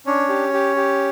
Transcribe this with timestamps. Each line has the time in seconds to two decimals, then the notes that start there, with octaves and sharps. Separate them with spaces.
0.06 C#4 D4 C#5
0.29 G4
0.54 G4
0.76 G4